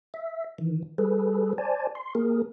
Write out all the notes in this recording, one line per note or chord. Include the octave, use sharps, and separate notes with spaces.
E5
D#3 E3
G3 G#4 A4 B4
C5 D5 G#5 A5
C6
A#3 G#4 A#4